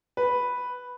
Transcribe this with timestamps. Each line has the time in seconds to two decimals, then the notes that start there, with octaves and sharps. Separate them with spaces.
0.17 B4